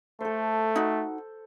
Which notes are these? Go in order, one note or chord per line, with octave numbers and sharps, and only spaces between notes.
A3 A4 C5
D#4 F#4